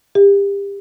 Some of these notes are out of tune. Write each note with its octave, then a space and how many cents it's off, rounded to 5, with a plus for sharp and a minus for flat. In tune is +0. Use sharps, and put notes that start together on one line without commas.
G4 +30